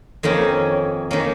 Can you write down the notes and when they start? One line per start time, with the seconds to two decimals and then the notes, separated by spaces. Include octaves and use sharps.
0.23 F2 D#3 A#3 C#4
1.11 D#3 A#3 C#4